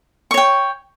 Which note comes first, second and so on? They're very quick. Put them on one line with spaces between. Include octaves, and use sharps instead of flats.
C#6 C#5 G5